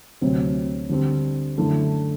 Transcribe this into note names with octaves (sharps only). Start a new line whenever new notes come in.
D2 C3 F#3 C4
D3 G3 C4
F#2 D3 A3 E4